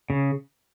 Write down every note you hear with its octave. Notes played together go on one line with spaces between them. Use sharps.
C#3